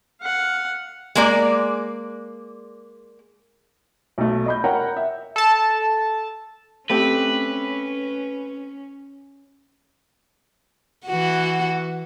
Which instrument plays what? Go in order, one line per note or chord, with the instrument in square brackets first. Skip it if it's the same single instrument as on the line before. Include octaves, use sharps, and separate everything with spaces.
[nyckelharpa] F5 F#5
[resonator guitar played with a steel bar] G#3 A#3 D5
[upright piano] B1 A3
D#5 B5 G6
A#4 C#5 F#5 G5 A#5 B5
E5
[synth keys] A4 A5
[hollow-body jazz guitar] A3 C4 G4 [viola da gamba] C#4 [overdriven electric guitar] B4
[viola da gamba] E3 F#4